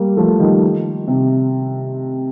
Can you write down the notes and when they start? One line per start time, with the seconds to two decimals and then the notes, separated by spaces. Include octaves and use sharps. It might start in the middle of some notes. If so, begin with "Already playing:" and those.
Already playing: G3 A#3
0.17 F3 A3
0.40 D#3 G3
1.08 C3